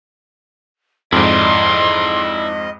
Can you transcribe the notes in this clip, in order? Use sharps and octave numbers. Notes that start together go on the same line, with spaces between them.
F2 G#2 E4 D5 D#5 C6